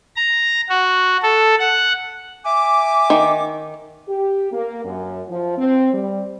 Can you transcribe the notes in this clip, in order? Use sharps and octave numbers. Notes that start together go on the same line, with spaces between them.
A#5
F#4
A4
F#5
E5 G#5 D6
D#3
G4
A#3
F#2
F3
C4
G3